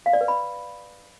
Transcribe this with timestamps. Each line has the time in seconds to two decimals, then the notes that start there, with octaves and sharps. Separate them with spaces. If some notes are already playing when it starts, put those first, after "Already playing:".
0.06 F5
0.13 D5
0.21 B4
0.28 B5